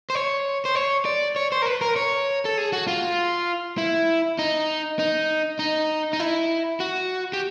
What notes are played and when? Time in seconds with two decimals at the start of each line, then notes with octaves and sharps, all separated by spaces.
0.10 C5
0.15 C#5
0.65 C5
0.75 C#5
1.05 D5
1.36 C#5
1.52 C5
1.62 A#4
1.66 B4
1.81 A#4
1.96 C#5
2.45 A4
2.58 G#4
2.73 F#4
2.88 F4
3.78 E4
4.39 D#4
4.99 D#4
5.59 D#4
6.13 D#4
6.20 E4
6.80 F#4
7.33 G4